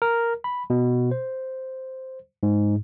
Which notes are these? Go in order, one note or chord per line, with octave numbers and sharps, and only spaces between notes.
A#4
B5
B2
C5
G#2